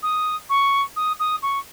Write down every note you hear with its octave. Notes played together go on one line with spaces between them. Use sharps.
D#6
C#6
D#6
D#6
C#6